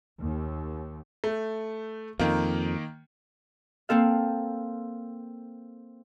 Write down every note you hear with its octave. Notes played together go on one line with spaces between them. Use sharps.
D#2
A3
F2 D#3 A#3
A#3 C4 A4 F5